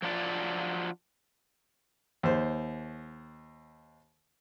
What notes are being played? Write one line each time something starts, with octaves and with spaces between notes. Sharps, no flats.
F3 F#3 D4 F4 A#4 D5
D#2 C5